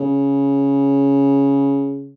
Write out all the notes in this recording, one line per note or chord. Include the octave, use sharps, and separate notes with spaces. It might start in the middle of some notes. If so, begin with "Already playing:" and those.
Already playing: C#3